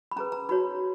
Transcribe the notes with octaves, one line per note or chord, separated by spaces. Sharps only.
B5
C#4 G#4 B4 A#5
A#5
D#4 F#4 C#5 B5